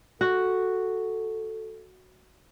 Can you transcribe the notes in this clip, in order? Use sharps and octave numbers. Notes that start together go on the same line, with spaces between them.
F#4 A4